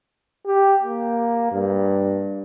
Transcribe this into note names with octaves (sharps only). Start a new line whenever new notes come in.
G4
A#3
G2